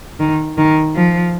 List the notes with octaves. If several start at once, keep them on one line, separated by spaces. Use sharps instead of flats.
D#3
D#3
F3